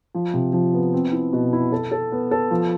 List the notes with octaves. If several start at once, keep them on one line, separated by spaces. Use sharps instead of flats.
F3
C3
F3
B3
C4
E4
B2
E4
A4
A4
B3
A4
F3